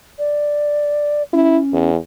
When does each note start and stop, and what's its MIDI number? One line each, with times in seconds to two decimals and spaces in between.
0.18 1.23 74
1.33 1.90 61
1.33 1.58 64
1.72 1.97 40